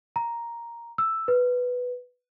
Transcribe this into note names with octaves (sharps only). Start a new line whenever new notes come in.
A#5
E6
B4